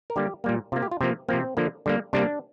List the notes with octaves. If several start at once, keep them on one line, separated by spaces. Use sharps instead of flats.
A#4
D3 G3 A#3 G4
A#2 G3 A#3
C3 A#3 F4
G4
F4
C3 F3 A#3 C4
C3 F3 A#3 C4
D3 F3 A#3
D3 G3 A#3
C3 G3 A#3 D4